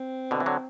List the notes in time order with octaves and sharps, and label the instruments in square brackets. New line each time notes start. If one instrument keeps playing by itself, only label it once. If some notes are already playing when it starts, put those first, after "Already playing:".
Already playing: [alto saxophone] C4
[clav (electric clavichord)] B2 D3
E3
D3 F#3